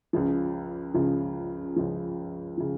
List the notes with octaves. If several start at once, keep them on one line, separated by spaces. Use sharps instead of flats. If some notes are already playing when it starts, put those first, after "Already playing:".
C#2 C#3 F3
C#2 C#3 F3
C#2 C#3 F3
C#3 F3